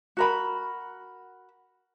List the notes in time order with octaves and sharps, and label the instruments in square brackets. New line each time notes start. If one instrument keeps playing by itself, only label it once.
[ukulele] F#4 A#4 B5